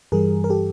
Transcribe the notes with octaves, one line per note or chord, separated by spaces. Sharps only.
G2 E3 G3 G#4 A#4
A#4
G4 A4